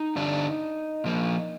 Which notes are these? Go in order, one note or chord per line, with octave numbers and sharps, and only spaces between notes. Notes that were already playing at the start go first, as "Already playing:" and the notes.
Already playing: D#4
G2 D3 G3 D4
A#2 F3 A#3